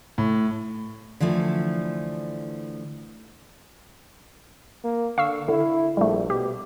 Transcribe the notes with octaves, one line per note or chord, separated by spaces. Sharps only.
A2
D3 E3 F3 A3
A#3
D3 F5 C#6 E6
D3 E4
A#1 G3 A3
B2 G4